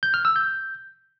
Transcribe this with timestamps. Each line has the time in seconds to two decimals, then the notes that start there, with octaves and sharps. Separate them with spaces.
0.03 G6
0.14 F6
0.25 E6
0.36 G6